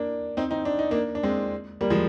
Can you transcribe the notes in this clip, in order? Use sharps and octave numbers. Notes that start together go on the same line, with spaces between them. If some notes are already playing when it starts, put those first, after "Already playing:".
Already playing: A#3 D4
C4 D#4
C4 D#4
D4
D#4
A#3 D4
D4
G#3 C4
G3 A#3
F3 G#3